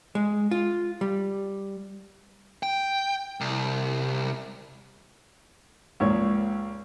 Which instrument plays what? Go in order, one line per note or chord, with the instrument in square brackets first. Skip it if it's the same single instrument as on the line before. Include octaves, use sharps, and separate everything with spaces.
[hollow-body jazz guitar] G#3
F4
G3
[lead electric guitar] G5
C2
[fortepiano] C#2 A#2 C#5